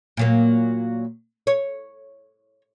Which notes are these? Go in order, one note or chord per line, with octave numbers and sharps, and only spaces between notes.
A#2 F#3 A#3
C#5